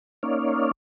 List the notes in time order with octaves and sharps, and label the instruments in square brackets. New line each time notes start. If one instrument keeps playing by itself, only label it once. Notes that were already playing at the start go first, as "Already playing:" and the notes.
[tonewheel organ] A#3 C#4 D#4 C#5 D5 F5